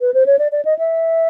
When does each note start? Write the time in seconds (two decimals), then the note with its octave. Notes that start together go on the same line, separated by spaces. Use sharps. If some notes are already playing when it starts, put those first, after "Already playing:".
0.01 B4
0.14 C5
0.26 C#5
0.39 D5
0.52 D5
0.65 D#5
0.79 E5